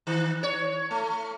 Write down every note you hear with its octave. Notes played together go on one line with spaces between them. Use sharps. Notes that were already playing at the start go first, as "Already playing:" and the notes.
D#3
C#5
A3